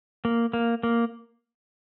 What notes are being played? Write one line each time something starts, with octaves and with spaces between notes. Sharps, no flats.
A#3
A#3
A#3